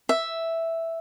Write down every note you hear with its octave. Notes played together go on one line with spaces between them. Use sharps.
E5